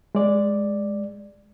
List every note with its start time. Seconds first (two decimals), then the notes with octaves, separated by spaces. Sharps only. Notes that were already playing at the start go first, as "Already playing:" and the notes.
0.15 G#3 D5